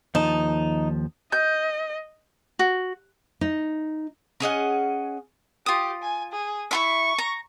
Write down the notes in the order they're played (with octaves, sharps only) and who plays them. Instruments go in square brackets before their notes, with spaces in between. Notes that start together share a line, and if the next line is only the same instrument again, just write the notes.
[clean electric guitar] D#2 F3 A5 [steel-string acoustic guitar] D#4
[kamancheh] D#5 [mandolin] G6
[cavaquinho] F#4
[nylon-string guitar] D#4
[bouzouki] C#4 G#4 D#5 F#5
[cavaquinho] F4 D#6 [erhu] G4
[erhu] G#5
G#4
[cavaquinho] E4 F4 E5 [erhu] C#6
[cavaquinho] A#5